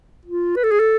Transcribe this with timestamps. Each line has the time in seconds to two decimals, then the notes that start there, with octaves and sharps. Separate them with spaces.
0.26 F4
0.56 B4
0.64 A4
0.71 G#4
0.80 A4